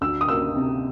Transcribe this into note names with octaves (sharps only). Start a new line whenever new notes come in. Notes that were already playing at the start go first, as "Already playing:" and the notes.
D2 E6
D#6
A#3 E6
C3